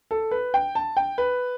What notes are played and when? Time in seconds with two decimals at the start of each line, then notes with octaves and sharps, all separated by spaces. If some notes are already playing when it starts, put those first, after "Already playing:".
0.11 A4
0.31 B4
0.54 G5
0.75 A5
0.97 G5
1.18 B4